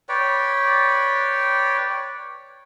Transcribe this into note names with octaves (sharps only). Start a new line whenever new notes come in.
B4 C#5 D5 G5